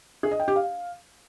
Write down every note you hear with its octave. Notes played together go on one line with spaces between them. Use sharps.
G#4
D#5
G5
G4
F5